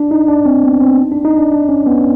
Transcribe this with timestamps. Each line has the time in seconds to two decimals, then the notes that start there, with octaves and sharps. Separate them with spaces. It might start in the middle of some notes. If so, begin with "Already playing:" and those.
Already playing: D4
0.11 D#4
0.28 D4
0.46 C4
0.64 B3
0.81 C4
1.12 D4
1.25 D#4
1.38 D4
1.51 D4
1.69 C#4
1.86 B3